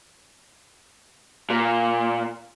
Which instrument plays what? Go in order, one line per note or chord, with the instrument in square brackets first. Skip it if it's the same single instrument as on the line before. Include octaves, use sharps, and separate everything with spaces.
[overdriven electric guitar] A#2